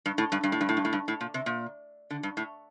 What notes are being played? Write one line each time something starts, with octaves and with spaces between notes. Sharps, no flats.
G2
A2
G2
G2
A2
G2
A2
G2
A2
G2
A2
A#2
C3
A#2
D3
G2
A2